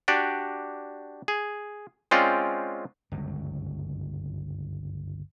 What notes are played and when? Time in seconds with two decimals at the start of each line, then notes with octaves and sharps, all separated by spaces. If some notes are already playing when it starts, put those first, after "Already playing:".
0.08 D4 F#4 G4 D5
1.28 G#4
2.11 G#3 C4 C#4 F4 D5 G5
3.12 G1 C#2 F#2